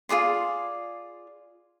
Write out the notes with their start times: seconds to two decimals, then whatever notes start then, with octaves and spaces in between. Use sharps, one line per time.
0.09 F4 G#4 D5 C6